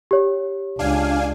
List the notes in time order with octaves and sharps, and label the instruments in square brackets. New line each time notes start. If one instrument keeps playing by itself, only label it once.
[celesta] G4 C#5
[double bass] C#2 [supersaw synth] D4 F5 G#5